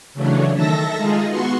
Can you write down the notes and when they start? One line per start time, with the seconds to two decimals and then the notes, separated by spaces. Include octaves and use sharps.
0.14 C#3 E3 F#3 A3 C#4 D4
0.53 D#3 A4 E5 A5 E6 A#6
0.96 G#3 D#4 F4 G#4
1.27 B3 F#4 C6 C#6